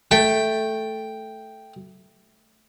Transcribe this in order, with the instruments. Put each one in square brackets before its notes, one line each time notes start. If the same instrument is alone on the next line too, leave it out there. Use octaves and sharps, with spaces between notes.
[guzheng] A3 [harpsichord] G5